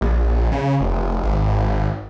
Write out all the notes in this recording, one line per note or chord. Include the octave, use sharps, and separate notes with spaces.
A#1
C#3
F1
G#1